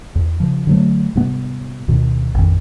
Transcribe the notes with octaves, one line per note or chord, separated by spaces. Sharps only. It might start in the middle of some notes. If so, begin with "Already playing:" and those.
E2
C#3 F3
D3 F#3 A3
G#2 C3 G3 B3
D2 B2 D#3
A1 F2 D#3